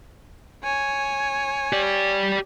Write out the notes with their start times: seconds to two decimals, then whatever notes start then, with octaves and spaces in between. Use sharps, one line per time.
0.64 C#5 G#5
1.73 G4 D5